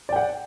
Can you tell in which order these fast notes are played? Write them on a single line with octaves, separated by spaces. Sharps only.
D5 G5 F#5